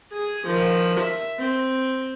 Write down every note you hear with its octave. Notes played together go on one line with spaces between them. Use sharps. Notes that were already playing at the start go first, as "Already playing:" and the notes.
G#4
D#3 F3
E5
C4